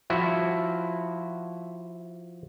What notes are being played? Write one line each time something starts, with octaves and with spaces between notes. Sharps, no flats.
F3 E4 F#4